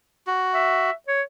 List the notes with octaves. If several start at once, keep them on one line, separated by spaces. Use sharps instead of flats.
F#4
E5
C#5